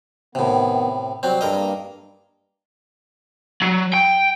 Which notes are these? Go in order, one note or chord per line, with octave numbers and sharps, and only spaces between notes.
A2 C3 D#3 B3
C3 F#3 G3 C4
G2 A4 A#4 D#5
A#3 A#5
F#3
G5